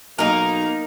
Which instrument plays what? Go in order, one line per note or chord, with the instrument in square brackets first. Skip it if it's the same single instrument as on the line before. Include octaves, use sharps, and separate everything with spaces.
[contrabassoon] B1 [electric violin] A#3 A#5 [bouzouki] D#4 A#4